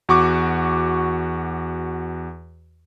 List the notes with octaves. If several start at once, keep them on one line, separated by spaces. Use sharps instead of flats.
E2 F#4 C#6 D6